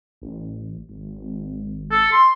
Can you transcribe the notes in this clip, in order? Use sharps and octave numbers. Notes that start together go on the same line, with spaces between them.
A1
G#1
A4
C6